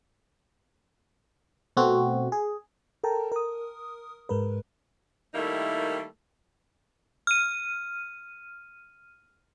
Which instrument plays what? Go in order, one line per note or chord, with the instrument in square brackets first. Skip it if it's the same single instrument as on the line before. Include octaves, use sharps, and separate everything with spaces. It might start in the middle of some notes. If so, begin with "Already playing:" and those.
[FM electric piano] B2 A3 C4 F#4
G#4
A4 A#4 G5 A5 A#5
A#4 D#6
G#2 G#3 A#4 B4
[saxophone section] D#3 G3 A3 A#3 D#4 E4
[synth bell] F6 D#7